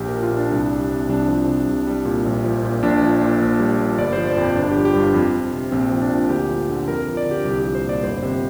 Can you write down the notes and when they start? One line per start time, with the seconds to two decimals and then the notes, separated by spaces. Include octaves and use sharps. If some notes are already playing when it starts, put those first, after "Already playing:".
Already playing: A#1 G4
0.09 F3 A#4
0.23 F4
0.31 A#2
0.37 D4
0.52 C2
0.71 G3
0.90 C3
1.09 C2 D4
1.28 F3
1.47 C3
1.67 C2
1.87 G3
2.05 A#2
2.25 A#1
2.44 F3
2.63 A#2
2.83 A#1 D4
3.01 F3
3.21 A#2
3.41 A#1
3.60 G3
3.79 A#2
3.98 G1 D5
4.13 F3 C5
4.27 D5
4.37 F2
4.56 G1 D4
4.71 G4
4.76 F3
4.85 G4
4.95 G2
5.00 F4
5.14 F2
5.33 F3
5.53 C3
5.71 A#1 C4
5.92 F3
6.02 D4
6.10 A#2
6.29 D2 G4
6.50 F3
6.69 D3
6.88 F2 A#4
7.02 A#4
7.08 F3
7.17 D5
7.27 D3 G4
7.45 C2 G4
7.60 G4
7.65 F3
7.75 C5
7.84 A#2
7.89 D5
8.03 G1 C5
8.22 C3